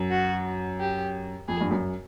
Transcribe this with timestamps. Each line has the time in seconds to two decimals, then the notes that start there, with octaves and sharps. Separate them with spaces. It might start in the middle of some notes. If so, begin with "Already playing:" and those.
Already playing: F#2
0.11 F#4
0.80 G4
1.48 F2 G#4
1.60 G2
1.71 F#2